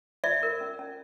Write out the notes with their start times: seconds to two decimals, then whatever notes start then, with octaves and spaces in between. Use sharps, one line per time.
0.24 F4 D5 E5
0.43 A#4
0.61 C#4
0.79 C#4